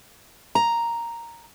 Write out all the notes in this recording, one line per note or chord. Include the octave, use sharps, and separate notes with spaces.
A#5